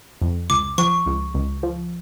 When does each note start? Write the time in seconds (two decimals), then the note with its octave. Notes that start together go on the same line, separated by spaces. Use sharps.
0.22 F2
0.50 C#2 D6
0.78 F3 C#6
1.06 C#2
1.35 C#2
1.63 F3